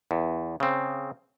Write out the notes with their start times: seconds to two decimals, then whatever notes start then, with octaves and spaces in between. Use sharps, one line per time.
0.11 E2
0.60 C#3 C4